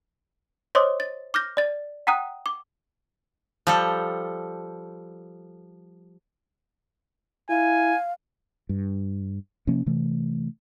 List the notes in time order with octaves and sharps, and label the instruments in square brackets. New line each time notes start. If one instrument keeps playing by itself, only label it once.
[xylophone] C5 C#5 D#5 C6 D6 D#6
A6
D6 F6 G6 A#6
D5 A6
F#5 G5 A#5 D#6 F#6
D6
[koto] F3 G3 A4
[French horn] E4 [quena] F5 [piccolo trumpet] G#5
[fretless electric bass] G2
C3 F3 A#3 C#4
C3 E3 A3